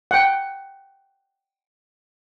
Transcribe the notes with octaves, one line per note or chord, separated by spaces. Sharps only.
F#5 G5